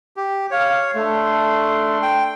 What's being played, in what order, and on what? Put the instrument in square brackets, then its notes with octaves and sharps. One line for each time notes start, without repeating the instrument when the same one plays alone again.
[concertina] G4
[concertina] C#5 [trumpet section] F5
[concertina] A3 [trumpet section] D4 A4 C6
[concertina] G5